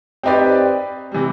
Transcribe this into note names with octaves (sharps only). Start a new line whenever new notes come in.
C4 D#4 G4 B4 D5
C3 E3 G3